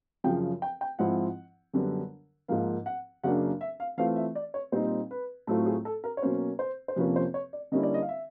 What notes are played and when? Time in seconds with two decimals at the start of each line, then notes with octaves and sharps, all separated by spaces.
0.24 F#2 C#3 F3 G5
0.62 G5
0.81 G5
0.99 G#2 F3 G#3 C4 E4 F#5
1.73 F#2 D3 G3 B3 D4
2.48 G#2 F3 A#3 F5
2.86 F#5
3.23 F#2 C#3 F#3 A#3 D4 F#5
3.61 E5
3.80 F5
3.97 E3 A3 C4 F4 F5
4.16 E5
4.35 D5
4.54 C#5
4.72 A#2 G3 C4 D#4 C5
5.11 B4
5.47 A2 F#3 A3 C4 F4 A4
5.66 G#4
5.85 A4
6.04 A#4
6.17 C#5
6.22 B2 F#3 A#3 C#4 C5
6.59 C5
6.88 C5
6.96 F2 C3 F3 A#3 C#4 B4
7.16 C5
7.34 C#5
7.53 D5
7.72 D3 G3 A#3 C#4 E4 D#5
7.83 D5
7.94 D#5
8.02 F5
8.09 E5